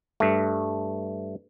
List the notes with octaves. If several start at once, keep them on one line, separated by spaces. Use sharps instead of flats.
G2 A3